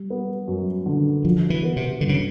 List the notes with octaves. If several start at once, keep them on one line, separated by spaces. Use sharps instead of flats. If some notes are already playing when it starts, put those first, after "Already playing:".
Already playing: G3
B3
F#2
D3
F3 F#3
E3
B3
C3
G2 D3
C#3